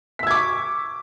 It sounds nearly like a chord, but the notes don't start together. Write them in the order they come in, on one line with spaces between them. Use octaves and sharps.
B6 E6 G#6 D6 C#6